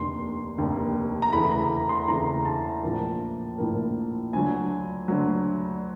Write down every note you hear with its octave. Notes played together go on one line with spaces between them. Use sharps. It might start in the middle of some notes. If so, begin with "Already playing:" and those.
Already playing: F1 D#2 D3 C6
F1 D#2 D3
A#5
E2 C#3 E3 A3 B5
A#5
C6
E2 C#3 E3 A3 A#5
A5
A#1 A2 F3 A#3
A#1 A2 F3 A#3
D2 D3 F#3 G#5
D2 D3 F#3